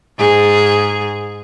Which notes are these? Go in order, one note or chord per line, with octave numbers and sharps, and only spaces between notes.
G#2 G#4